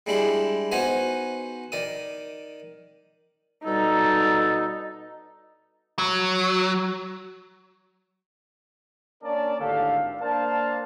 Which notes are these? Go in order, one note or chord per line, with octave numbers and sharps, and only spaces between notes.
G3 G#3 D4 E4 G4
B3 D#4 F#4 C5 D#5 G#5
D#3 D5 D#6
B2 G3 D#4 A4
F#3
A#3 C#4 D4 A#4 D5 A5
G#1 A2 D3 G4 A4 F5
A#3 D4 A#4 C5 F5 A5